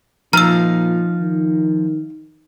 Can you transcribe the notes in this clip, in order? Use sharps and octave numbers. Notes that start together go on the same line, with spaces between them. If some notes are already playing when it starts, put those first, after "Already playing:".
A#2 F3 D#4 F5 A#5 E6
D#3